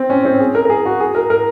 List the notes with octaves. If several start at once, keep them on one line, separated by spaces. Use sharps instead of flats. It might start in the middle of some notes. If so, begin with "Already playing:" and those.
Already playing: C4
C#4
C4
G#4
A#4
A#4
G#4
F#4
G#4
A#4
A#4